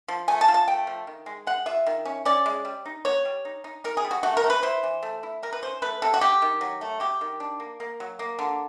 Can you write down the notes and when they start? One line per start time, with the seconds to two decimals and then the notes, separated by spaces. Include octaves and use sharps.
0.08 F3
0.28 A3 G#5
0.41 A5
0.48 F4
0.54 A5
0.67 A3 G5
0.87 F3
1.07 D#3
1.26 G#3
1.47 G#3 F#5
1.66 F4 E5
1.86 D#3
2.05 C#4
2.25 C#4 D5
2.46 G#3
2.65 G3
2.86 D#4
3.05 B3 C#5
3.25 G3
3.45 D#4
3.64 D#4
3.84 D#4 A#4
3.97 G#4
4.04 G3
4.11 F#4
4.23 A3 F#4
4.37 A#4
4.44 A3
4.50 B4
4.63 E4 C5
4.83 E3
5.03 A3
5.23 E4
5.43 E4 A#4
5.53 B4
5.62 C#4 C5
5.82 A3 B4
6.02 C3 A4
6.14 F#4
6.21 F#3 G4
6.42 D#3
6.61 F#3
6.81 A3
7.00 F#3 G4
7.21 D#3
7.40 D4
7.60 A#3
7.80 A#3
8.00 F#3
8.19 A#3
8.39 D3